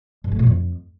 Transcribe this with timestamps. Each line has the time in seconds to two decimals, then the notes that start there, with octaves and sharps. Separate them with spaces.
0.24 G2
0.32 A3
0.39 A#2
0.47 F2